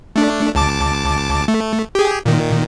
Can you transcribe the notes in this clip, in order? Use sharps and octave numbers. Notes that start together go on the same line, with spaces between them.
A3 D4
C#2 A5 D6
A3
G4 G#4
A#2 D#3